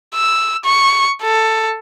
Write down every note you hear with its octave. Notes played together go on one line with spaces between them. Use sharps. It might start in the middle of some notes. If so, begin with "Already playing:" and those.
E6
C#6
A4